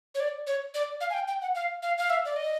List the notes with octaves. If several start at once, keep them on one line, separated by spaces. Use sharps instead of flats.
C#5
D5
C#5
D5
F5
G#5
G5
G5
F#5
F5
F5
F5
E5
D5
D#5